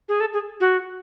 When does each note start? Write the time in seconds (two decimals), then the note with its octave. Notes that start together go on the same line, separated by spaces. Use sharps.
0.09 G#4
0.20 A4
0.33 G#4
0.60 F#4